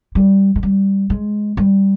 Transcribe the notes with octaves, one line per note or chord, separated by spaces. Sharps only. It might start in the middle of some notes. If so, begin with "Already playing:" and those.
G3
G#3
G3
G#3
G3